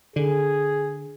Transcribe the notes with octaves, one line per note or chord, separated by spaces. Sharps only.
D3 G#4